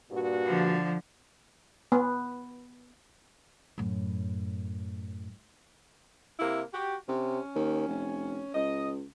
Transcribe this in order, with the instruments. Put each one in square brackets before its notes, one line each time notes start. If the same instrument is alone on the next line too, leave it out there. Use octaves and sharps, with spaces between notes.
[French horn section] G2 A#2 F#4
[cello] D3 F3
[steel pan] B3
[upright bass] F#2 A2
[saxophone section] C3 A#3 E4
F#4 G4
[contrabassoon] C3 [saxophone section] C#4
[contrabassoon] D#2
F1
[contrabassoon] C#2 [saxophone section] D#5